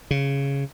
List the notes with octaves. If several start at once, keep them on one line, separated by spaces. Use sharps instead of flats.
C#3